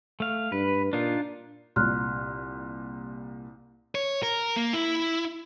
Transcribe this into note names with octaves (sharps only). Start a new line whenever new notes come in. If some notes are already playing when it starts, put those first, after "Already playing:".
A3 F5
G2 B4
A#2 D4 D#4 F4
C2 A#2 C6 F6 F#6
C#5
A#4
A#3
E4